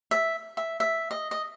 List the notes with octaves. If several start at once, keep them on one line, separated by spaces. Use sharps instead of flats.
E5
E5
E5
D#5
D#5